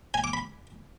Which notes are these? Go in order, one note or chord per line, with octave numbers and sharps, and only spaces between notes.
G#5
D6
B5